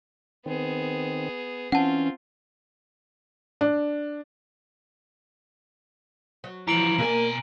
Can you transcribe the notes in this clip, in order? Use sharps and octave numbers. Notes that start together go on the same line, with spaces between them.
D#3 B3 C4 G#4
E3 C4 C#4 F4 F#5 A5
D4
F#3
E3 F3 A#5 D7 F#7
B2 A#3 A#4 D5 G#5